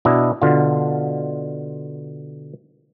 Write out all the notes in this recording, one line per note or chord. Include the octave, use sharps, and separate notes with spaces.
B2 D4 E4 D#5
B2 D3 F4